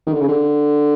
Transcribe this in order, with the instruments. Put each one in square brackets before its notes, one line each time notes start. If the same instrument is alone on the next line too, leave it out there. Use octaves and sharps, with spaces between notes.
[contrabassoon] D#3
D3
C#3
D3